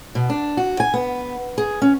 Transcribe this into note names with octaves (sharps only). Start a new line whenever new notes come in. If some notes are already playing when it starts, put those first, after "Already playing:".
B2
D4
F#4
G#5
B3
G#4
C#4